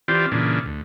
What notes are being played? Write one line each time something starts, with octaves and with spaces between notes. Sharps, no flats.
E3 C4 F4 G4 D5
A#2 C#3 E3 D4
D2